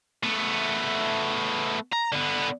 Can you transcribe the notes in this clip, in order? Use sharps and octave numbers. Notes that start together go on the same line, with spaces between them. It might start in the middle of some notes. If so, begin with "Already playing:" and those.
A3 B3
A#5
D3 B3